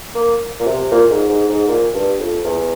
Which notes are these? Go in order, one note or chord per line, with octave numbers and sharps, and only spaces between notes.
A#3
A#2
C3
A#2
G#2
G#2
G#2
A#2
G2
F2
E2